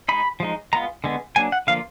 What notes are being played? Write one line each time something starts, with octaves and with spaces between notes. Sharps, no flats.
G#3 D#4 B5
F3 G#3 D#4
G#3 B3 F4 A#5
D3 G#3 B3
F#3 A#3 D4 G#5
F#5
D3 F3 A#3 F4 F5